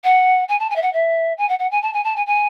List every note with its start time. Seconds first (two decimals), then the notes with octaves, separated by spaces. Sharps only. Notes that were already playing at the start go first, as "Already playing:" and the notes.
0.04 F#5
0.48 G#5
0.59 A5
0.70 G#5
0.76 E5
0.82 F#5
0.93 E5
1.37 G#5
1.49 F#5
1.59 F#5
1.71 G#5
1.82 A5
1.93 G#5
2.04 A5
2.16 G#5
2.26 G#5